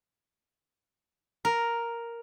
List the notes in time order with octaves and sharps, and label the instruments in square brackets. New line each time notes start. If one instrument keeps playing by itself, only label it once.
[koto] A#4